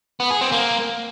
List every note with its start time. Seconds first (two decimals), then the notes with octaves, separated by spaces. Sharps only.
0.20 B3
0.31 G#4
0.41 C4
0.52 A#3